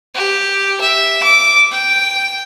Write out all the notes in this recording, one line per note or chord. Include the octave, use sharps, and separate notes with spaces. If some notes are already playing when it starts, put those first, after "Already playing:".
G4
E5
D6
G5